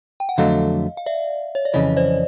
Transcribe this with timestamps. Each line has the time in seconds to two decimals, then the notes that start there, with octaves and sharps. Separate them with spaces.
0.20 G5
0.29 F#5
0.38 F2 D3 F#3 A3 D#5 F5
0.97 F5
1.06 D5 E5
1.55 C#5
1.65 D5
1.74 F2 C#3 E3 C#5 D#5
1.97 C5 D5